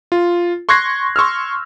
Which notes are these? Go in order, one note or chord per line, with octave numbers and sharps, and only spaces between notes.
F4
C6 C#6 F#6 G#6 A#6 C7
C6 C#6 E6 F6